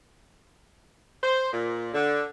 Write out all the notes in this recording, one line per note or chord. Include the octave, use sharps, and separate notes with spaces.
C5
A#2
D3